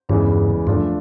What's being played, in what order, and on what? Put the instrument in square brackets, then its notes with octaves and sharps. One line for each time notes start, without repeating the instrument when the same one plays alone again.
[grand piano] E2 C#3 E3 G#3 [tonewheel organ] G2
[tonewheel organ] G2 [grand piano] F3 A3 D4 F4